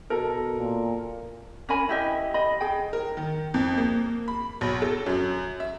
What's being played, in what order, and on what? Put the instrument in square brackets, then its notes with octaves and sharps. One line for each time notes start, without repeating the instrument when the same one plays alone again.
[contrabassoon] B2 [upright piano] A4 A#4
[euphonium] A#2
[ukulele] C#4 A#4 G#5 B5
E4 G4 D#5
D#5 B5
G#4 G5
[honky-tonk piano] A#4
D#3
F2
A#3
B5
B1
A4
F#2
E5